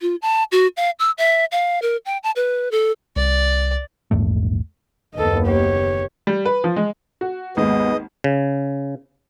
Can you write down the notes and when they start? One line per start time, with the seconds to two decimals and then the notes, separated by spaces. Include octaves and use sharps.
0.02 F4
0.22 A5
0.52 F#4
0.77 F5
0.99 E6
1.18 E5
1.52 F5
1.82 A#4
2.05 G5
2.23 A5
2.36 B4
2.72 A4
3.16 C2 D5
4.11 A#1 E2 G#2 A3
5.14 F#1 D#2 B3 A4 D#5
5.47 G4 C#5
6.27 G3
6.45 B4
6.64 F3
6.77 G#3
7.21 F#4
7.57 G#1 D#2 G#3 B3 D#5
8.24 C#3